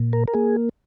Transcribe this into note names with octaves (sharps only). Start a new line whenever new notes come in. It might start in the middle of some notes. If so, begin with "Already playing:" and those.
Already playing: A#2
A#4
A#4
A#3 G#4